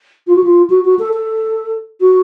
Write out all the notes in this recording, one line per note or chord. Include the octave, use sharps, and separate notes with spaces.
F4
F#4
F4
F#4
F#4
A4
A4
F#4